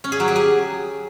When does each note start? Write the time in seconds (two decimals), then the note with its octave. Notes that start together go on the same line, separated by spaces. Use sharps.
0.04 C#4
0.12 G#4
0.20 F#3
0.28 G4
0.36 G#4